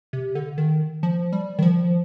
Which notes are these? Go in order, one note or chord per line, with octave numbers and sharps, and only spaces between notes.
C3
D3
D#3
F3
G3
D#3
F3